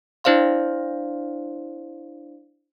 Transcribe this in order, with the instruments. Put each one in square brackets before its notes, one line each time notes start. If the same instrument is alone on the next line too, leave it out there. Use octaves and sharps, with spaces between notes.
[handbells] D4 E4 C5 D5 F5 C6